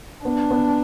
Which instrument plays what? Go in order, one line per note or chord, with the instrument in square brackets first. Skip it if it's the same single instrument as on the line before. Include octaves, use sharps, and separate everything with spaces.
[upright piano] B3 [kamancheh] D4
[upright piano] B3